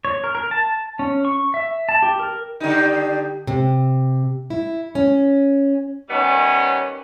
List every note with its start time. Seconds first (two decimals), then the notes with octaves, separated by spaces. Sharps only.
0.05 C#5
0.24 A#4
0.35 A#4
0.51 A5
0.99 C#4
1.25 C#6
1.54 E5
1.89 A5
2.03 G4
2.19 A#4
2.60 D3 G3 D#4
3.47 C3
4.50 E4
4.95 C#4
6.09 D#3 G3 B3 C#4